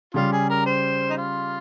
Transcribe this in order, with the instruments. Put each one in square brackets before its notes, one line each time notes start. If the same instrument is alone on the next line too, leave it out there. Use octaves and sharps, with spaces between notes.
[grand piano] C#3 G3 C#4 [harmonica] F4
[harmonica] G#4
A#4
C5
D#4
F4